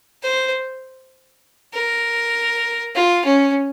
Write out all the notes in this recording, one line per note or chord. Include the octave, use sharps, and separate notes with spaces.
C5
A#4
F4
C#4